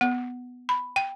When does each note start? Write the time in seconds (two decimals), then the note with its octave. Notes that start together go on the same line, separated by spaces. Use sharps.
0.01 B3
0.69 B5
0.96 G5